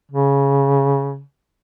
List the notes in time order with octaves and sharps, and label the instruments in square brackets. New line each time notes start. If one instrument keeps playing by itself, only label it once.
[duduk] C#3